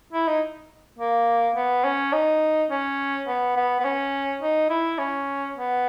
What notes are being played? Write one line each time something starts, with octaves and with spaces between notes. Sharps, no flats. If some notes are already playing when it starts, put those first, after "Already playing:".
E4
D#4
A#3
B3
C#4
D#4
C#4
B3
B3
B3
C#4
D#4
E4
C#4
B3